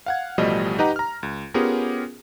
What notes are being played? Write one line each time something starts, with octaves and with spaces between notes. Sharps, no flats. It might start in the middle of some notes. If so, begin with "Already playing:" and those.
F5 F#5 G#6
A1 B2 F3 G3 A3 D#5
D#4 G4 B4 D#5 F#5 A#5
A#5 F6
C#2
B3 C#4 F4 G4 G#4 A#4